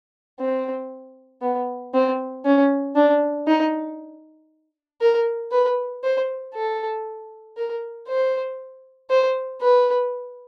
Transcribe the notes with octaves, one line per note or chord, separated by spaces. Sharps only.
C4
B3
C4
C#4
D4
D#4
A#4
B4
C5
A4
A#4
C5
C5
B4